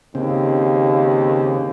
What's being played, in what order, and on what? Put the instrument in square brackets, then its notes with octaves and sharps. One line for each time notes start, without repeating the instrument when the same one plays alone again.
[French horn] D#2 [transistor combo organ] C#3 C4